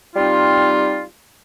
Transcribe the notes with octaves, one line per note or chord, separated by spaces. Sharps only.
G3 C4 D#4 F4